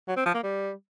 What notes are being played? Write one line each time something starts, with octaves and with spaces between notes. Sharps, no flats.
F#3
C4
F3
A#3
G3